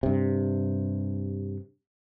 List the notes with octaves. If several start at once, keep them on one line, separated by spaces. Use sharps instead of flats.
G2 C3